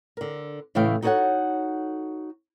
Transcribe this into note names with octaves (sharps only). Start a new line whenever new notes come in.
D3 A#4
A2 C#3 E3 A3 F5 G5
D#4 F#4 A4 C5 C#5 F#5